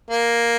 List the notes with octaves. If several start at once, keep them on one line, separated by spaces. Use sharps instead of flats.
A#3